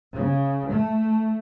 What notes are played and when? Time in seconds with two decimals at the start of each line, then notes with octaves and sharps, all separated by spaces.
0.14 C#3
0.71 A3